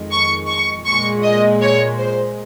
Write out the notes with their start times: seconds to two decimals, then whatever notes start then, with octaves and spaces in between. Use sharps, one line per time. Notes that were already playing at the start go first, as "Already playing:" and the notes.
Already playing: F2 D#3 G#3
0.11 C#6
0.49 C#6
0.86 A#2 G#3 C#6
1.23 D#5
1.61 C#5
1.98 C5